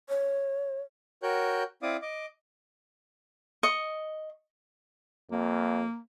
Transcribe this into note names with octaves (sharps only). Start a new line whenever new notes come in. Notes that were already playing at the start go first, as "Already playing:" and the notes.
C#5
F#4 A#4 C#5 G5 F#6 G6
C4 E4 D5 F5 D6 D#6
D#5 D6
D#5 C#6
F2 A#3